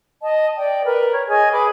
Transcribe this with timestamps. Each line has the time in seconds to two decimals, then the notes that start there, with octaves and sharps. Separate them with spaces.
0.23 D#5 A5
0.57 D5 G5
0.85 A#4 B4
1.12 C#5
1.29 G#4 C#5 D#5 G#5
1.52 G#4 B4 B5 D6